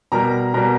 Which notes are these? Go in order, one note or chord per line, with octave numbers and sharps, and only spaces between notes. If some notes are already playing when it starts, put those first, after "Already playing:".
B2 G3 A#4 A#5
B2 G3 A#4 A#5